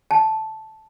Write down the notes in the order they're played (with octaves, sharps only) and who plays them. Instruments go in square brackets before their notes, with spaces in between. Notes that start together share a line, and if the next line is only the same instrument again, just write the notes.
[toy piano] A5